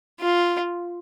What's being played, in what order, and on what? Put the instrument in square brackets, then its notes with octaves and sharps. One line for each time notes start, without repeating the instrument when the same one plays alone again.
[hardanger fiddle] F4